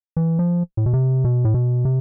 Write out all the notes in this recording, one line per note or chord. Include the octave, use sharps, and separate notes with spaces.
E3
F3
A2
B2
C3
B2
A2
B2
C3